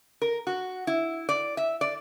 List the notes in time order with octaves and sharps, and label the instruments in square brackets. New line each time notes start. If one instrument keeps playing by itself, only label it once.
[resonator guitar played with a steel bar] A#4
F#4
E4
D5
E5
D5